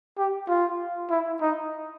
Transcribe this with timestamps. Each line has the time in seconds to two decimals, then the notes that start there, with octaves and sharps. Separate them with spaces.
0.18 G4
0.49 F4
1.10 E4
1.41 D#4